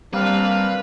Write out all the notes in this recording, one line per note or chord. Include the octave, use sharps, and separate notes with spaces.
G3 A#3 C4 D4 B4 F5